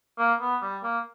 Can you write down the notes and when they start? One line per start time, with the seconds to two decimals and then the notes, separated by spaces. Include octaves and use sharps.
0.18 A#3
0.40 B3
0.62 G3
0.83 A#3